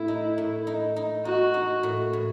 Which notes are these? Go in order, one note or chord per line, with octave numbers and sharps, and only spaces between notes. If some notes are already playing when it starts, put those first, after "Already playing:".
Already playing: A2 E4
D#4
A2
D#4
D#4
D#4 F#4
D#4
A2
A2